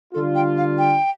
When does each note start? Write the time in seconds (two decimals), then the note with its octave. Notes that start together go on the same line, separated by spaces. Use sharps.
0.14 D3 G3 D4 F4 A4
0.35 G5
0.57 F5
0.78 G5